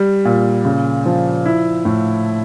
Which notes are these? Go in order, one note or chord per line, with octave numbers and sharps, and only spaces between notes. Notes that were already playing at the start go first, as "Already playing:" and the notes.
Already playing: G3
A#2
C#3
F3
E4
A2